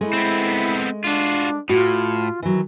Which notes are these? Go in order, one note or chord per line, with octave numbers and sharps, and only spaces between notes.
G#3 A3 E4
B3 C4
D4 F4 F#4
A2 F4 F#4
D#3 E3 F#3